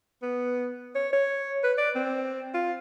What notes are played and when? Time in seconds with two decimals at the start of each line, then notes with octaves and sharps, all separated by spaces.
0.23 B3
0.95 C#5
1.13 C#5
1.64 B4
1.78 D5
1.95 C4
2.54 F4